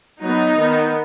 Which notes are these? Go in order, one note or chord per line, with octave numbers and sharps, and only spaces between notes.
F#3 B3 D#4
D#3 B3